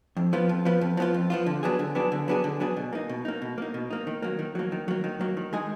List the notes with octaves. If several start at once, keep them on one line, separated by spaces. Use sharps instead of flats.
F2
F3 B3 F4
F2
F3 B3 F4
F2
F3 B3 F4
F2
F3 B3 F4
D3
F#3 B3 D4 G#4
D3
F#3 B3 D4 G#4
D3
F#3 B3 D4 G#4
D3
F#3 B3 D4 G#4
B2
A#3 D#4
B2
A#3 D#4
B2
A#3 D#4
B2
A#3 D#4
D#3
F#3 A#3
D#3
F#3 A#3
D#3
F#3 A#3
D#3
F#3 A#3
D#3
G#3 D#4 G#4